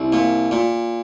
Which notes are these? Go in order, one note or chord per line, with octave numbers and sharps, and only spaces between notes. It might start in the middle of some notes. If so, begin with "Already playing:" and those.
Already playing: C2
A#2
A#2